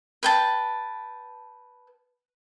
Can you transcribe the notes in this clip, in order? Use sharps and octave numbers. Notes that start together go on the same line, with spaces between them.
B4 G5 A5